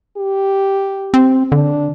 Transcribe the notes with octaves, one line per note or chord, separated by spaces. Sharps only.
G4
C4
D3 D4